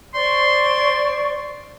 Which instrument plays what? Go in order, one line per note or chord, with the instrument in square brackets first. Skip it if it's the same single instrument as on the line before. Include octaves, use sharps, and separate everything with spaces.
[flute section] C5 D5 C#6 [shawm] C6